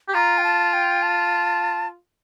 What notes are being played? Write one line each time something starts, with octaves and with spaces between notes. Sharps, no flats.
G4
F4 A#5
G5
A5
G5
A5